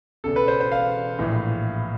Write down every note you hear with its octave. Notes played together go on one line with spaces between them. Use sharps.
E1 E2 C#3 A4
B4
C5
C5
F5
A#1 A2 E3